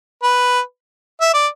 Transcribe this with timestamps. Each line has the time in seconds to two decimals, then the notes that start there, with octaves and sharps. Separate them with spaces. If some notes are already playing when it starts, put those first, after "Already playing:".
0.23 B4
1.21 E5
1.34 D5